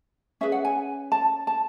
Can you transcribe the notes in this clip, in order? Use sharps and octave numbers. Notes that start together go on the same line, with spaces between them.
C#4 G#4 B4 E5
F#5
G#5
A5
A5